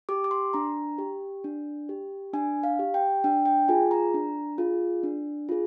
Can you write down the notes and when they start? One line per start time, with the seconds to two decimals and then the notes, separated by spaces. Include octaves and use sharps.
0.09 G4 D6
0.24 D6
0.31 C6
0.53 D4 A#5
0.98 G4
1.44 D4
1.89 G4
2.33 D4 G#5
2.63 F5
2.79 G4
2.94 G5
3.24 D4 G5
3.46 G5
3.68 F4 G#4 G#5
3.91 A#5
4.14 D4
4.58 F4 G#4
5.03 D4
5.49 F4 G#4